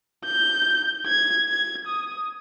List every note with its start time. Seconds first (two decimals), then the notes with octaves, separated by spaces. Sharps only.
0.24 G6
1.06 G#6
1.48 G#6
1.87 D#6